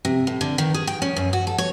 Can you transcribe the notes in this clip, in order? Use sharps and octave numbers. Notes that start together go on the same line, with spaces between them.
C3
A2
D3
D#3
G#4
G5
C#4
F#2
F#4
A4
C#5